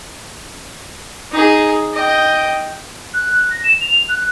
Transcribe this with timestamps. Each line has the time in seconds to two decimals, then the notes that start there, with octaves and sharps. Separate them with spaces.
1.32 D#4 G#4
1.94 D#5 G5
3.14 F#6
3.50 A#6
3.64 E7
3.81 F7
4.09 F#6